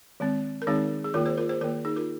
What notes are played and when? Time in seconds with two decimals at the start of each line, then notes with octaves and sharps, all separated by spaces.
0.20 D#3 G#3 C4
0.62 A#4
0.67 D#3 G#3 C4 D#4 G#4
1.04 G#4
1.14 D#3 A#3 F4 A#4
1.26 G#4 C5
1.37 F4 A#4
1.49 G#4 C5
1.61 D#3 F4 A#4
1.64 A#3
1.85 D#4 G#4
1.96 F4 A#4